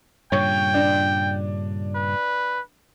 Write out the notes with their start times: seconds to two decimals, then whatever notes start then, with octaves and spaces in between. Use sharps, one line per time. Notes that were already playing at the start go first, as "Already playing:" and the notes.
0.32 G2 A#2 C#3 C#5 G5
0.74 D4
1.95 B4